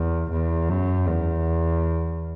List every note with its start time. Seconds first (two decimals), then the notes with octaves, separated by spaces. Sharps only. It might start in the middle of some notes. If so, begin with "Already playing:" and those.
Already playing: E2
0.31 E2
0.69 F#2
1.07 E2